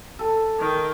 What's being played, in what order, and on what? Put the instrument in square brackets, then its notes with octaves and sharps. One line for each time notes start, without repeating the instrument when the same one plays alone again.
[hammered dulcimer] A4 G#5
[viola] D#3 G5